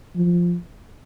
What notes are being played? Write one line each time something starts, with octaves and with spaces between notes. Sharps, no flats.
F3